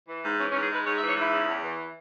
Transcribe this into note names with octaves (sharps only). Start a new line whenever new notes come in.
E3
G#2
E3 C#4
C#4
G#2
G#4
G#3 B4
G#2 C#5
E5
E3
C#5
G#2 E4
C#3
E2
E3